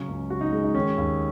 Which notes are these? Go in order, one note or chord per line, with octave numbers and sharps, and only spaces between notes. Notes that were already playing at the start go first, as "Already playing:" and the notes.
Already playing: C#3 F#3 C#4
C#2
C#2 F#4
D#4
G#3
D#4
D#3 C#4
D#2